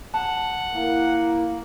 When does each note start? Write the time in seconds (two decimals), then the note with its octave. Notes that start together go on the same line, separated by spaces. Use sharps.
0.14 F#5 A5
0.74 A#3 E4